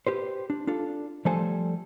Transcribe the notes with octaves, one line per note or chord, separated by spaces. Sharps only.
G4 B4 C5
D4
D4 F4 A4
F3 G3 A3 A4 C5 G#5